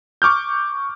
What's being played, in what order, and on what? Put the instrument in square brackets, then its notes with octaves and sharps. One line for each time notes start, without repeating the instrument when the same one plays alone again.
[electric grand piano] C#6 D6 F6 G6